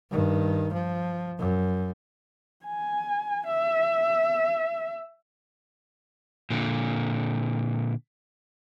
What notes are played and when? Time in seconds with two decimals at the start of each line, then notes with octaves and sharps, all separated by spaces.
0.11 G2 D#3
0.73 F3
1.39 F#2
2.65 G#5
3.47 E5
6.50 A#2 D3